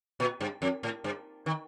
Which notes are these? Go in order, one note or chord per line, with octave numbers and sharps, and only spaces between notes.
A#2
G2
F2
A2
G2
D#3